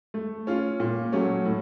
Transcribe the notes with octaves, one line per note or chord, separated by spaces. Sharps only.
A3
C#4 F4
A#2
F#3 A3 C#4
A2